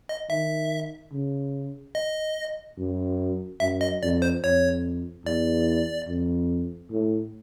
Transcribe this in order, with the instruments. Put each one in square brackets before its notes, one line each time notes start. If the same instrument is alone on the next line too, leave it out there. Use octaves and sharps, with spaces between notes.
[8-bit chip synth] D#5
[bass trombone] D#3 [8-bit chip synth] E5
[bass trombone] C#3
[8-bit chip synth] D#5
[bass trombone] F#2
[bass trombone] F#2 [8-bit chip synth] E5
[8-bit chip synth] D#5
[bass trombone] F2 [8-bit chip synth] D5
[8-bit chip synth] C5
[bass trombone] F2 [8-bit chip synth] C#5
[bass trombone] E2 [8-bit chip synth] D5
[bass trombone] F2
A2